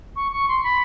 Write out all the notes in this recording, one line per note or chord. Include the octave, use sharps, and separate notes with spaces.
C#6
C#6
C6
B5